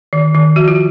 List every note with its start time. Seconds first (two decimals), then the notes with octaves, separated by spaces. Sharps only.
0.13 D#3
0.35 D#3
0.56 F3 F#4
0.68 F4